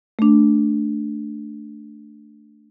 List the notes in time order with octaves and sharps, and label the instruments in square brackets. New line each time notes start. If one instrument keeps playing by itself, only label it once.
[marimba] A3 D4